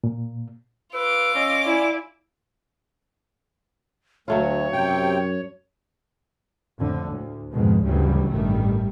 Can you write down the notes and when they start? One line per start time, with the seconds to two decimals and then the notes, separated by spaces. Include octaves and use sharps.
0.04 A#2
0.94 F4 B4 D6 E6
1.35 C#4 D#5
1.66 E4 D5 G#5
4.28 D2 F#3 A3 F4 C#5
4.73 F#2 C3 G5
6.78 F2 A2 D3
7.11 D2
7.53 F2 G#2 B2 D#3 G#3
7.85 D2 G2 C#3 E3 F#3 G3
8.31 A1 G2 D#3 G3 A3